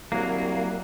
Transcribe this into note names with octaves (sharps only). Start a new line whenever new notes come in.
C2 F#3 A#3